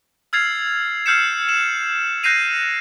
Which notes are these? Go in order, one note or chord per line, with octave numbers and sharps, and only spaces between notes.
E6 F6 G#6 A6 C7 F7
E6 F6 G6 C7 C#7 E7
E7 F#7
F#6 G6 A#6 C7 D#7 F7